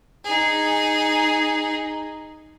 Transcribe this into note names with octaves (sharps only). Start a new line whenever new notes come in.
D#4 G#4